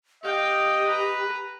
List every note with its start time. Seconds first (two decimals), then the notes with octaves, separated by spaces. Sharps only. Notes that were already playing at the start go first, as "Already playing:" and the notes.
0.24 G4 D#5 F5 G5
0.86 B4 A#5